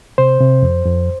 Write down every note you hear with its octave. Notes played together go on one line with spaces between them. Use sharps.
C3 C5
C3
F2
F2